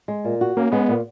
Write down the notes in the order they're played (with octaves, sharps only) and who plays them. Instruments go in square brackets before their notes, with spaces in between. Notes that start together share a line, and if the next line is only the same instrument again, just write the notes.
[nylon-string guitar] G#3
A#2
F#4
[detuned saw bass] A#3 [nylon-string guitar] C#4
[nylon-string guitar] G#3 [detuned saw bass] B3
[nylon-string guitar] A#2